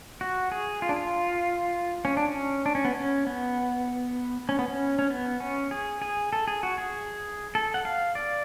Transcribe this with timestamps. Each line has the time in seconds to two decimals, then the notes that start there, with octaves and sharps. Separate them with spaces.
0.21 F#4
0.52 G#4
0.82 F4
0.89 D4
0.96 F4
2.05 C#4
2.17 D4
2.28 C#4
2.66 D4
2.75 C#4
2.85 B3
2.95 C#4
3.27 B3
4.49 C#4
4.59 B3
4.68 C#4
4.99 C#4
5.10 B3
5.40 C#4
5.71 G#4
6.02 G#4
6.33 A4
6.48 G#4
6.63 F#4
6.78 G#4
7.55 A4
7.74 F#5
7.85 F5
8.15 D5